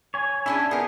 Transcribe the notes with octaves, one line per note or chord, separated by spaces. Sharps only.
C#5 G#5
C#4 D4 E4 G#4 G#5
B3 D#4 G#4 A#4